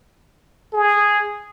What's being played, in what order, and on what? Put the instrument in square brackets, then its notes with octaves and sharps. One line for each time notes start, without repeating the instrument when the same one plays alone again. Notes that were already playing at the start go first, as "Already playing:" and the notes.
[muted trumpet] G#4